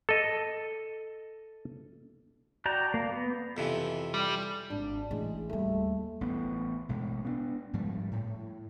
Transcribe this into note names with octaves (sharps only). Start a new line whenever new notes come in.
A4 D#5
F#4 D5 G5 A5 A#5
A#3
B3
F2 C3 E3
G3
G#1 D4
A1 A2 G#3
D#2 G3 A3
A1 B3
A1 B2 G#3
B3 C#4 D4
G#2 F3 G3 G#3
A2